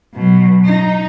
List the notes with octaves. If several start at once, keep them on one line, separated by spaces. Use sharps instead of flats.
B2 F#3
D#4